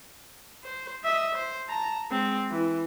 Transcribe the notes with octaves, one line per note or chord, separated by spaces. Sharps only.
C5
D#5 E5
C5
A5 A#5
G#3 C4
E3